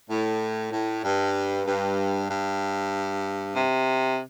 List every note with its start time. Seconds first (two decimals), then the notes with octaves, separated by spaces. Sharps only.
0.10 A2
0.72 A2
1.04 G2
1.66 G2
2.30 G2
3.55 C3